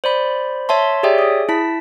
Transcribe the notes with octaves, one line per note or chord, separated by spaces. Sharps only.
C5 D5 B5
C#5 E5 A5 C6
G4 G#4 C#5 D5 E5 G5
G#4 D#6
E4 A5 B6